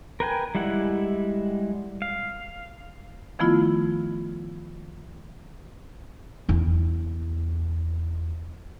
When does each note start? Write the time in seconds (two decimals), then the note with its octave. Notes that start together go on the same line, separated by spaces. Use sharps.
0.20 A#4 B4 G5 G#5
0.55 G3 G#3 E4 F#5
2.02 F5
3.39 D#3 F3 A3 B3 E4 F4
6.49 E2 E4